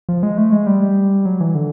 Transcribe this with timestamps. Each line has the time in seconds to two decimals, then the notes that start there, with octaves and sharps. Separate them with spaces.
0.09 F3
0.23 G#3
0.38 A3
0.52 G#3
0.66 G3
1.25 F#3
1.40 E3
1.55 D3